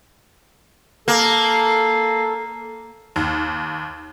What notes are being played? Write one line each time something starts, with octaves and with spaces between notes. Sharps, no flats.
A#3 A4
D#2